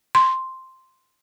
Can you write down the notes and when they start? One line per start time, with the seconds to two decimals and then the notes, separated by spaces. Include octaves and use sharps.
0.15 C6